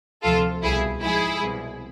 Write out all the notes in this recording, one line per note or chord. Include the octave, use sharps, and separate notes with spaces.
D2 C3 F3 F4 A4
C2 B2 E4 G#4
G#2 F3 E4 G#4
C2 B2